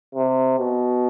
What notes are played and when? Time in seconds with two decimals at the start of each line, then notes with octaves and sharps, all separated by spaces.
0.15 C3
0.59 B2